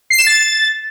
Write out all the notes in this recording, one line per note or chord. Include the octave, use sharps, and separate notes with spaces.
C7
E7
A6